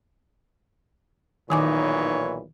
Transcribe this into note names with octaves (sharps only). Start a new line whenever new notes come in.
B1 A#2 D#3 E3 D#4 C#5 G#5 D6